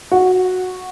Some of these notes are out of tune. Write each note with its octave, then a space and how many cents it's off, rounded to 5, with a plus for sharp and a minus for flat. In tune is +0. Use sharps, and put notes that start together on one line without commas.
F#4 -10